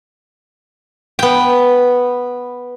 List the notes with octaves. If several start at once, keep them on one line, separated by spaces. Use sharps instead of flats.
B3 G5